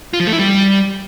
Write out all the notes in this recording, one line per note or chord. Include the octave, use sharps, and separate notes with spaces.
F4
F3
A3
E4
G3